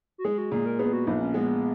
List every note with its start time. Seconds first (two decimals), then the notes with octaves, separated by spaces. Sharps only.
0.18 F#4
0.25 G#3 G#4
0.38 F#4
0.52 A#2 G#4
0.66 A#4
0.79 B3 G#4
0.93 F#4
1.07 A#1 D#4
1.21 C#4
1.34 G#3 B3